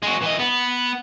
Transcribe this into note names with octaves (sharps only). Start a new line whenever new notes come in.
G#3 F#4
E3 D#5
B3